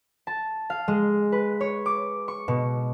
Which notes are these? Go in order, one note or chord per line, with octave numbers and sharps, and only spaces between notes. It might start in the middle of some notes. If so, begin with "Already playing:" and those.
A5
F5
G#3
B4
C#5
D6
C#6
B2